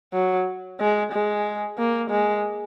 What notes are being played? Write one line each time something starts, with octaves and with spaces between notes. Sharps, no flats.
F#3
G#3
G#3
A#3
G#3